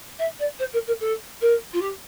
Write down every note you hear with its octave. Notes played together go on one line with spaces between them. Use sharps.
E5
D5
C5
A#4
A#4
A4
A#4
F4
G4